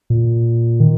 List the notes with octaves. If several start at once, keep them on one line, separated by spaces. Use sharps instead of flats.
A#2
D#3